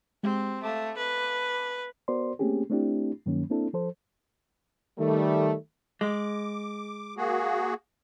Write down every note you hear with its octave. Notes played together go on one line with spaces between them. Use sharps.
G#3 C4 G4
A3 F5 A5 D6
B4
B3 F#4 A#4 C5 D5 C6
A3 A#3 C4 C#4 G4 G#4
A3 C4 D4 E4 G4
G2 D#3 F#3 A#3 C#4
A#3 C4 D4 E4 A4
F3 A4 C5
D#3 G3 A3
G#3 D6
A#3 F#4 G#4